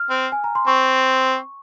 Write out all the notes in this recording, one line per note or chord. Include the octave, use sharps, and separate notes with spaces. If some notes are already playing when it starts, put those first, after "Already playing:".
Already playing: F6
C4
G#5
A#5
C6
C4 C#6